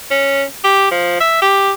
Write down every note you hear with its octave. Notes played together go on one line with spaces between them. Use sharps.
C#4
G4
F3
E5
G4